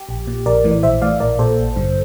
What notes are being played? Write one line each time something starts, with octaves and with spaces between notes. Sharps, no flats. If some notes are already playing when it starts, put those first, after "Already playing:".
Already playing: G4
A#1
A#2
A#1 A#4 D5
A2 E3
D5
A#1 C5 E5
A2 E3 D5 F5
A#1 A#4 D5
A#2 A4 C5
A1
G2 D3